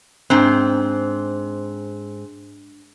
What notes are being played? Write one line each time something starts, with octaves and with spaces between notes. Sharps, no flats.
G#2 C4 D4 F#6